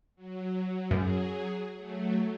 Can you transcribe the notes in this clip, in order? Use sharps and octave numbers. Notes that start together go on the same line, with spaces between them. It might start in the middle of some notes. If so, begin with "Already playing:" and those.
F#3
F#2 F#3 G#4
F#3 A3